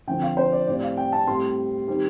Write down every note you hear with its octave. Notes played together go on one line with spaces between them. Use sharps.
D3 F3 C4 G5
F5
C5
D5
A2 G3 C4 D5
F5
G5
A5
A2 G3 C4 C6
D#3 G3 C4